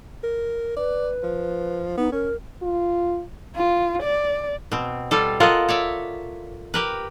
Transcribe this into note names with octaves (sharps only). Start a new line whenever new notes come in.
A#4
B4 D5
F3
B3 D#4
C#4 A#4
F4
F4
D5
B2 C4
G3 F4 A4
F4 A4 A#4 D#5 F#5
C#5 D5 E5
G4 A#4 B4